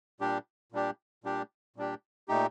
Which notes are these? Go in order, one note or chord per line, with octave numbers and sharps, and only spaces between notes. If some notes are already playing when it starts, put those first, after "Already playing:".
A#2 G3 D4 G4
A#2 G3 D4 G4
A#2 G3 D4 G4
A#2 G3 D4 G4
A#2 A3 D#4 G4